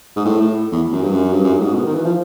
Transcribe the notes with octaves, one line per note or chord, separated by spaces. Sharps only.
G#2
A2
A2
E2
F#2
G2
F#2
G2
F#2
G2
A2
G#2
B2
D#3
E3
F3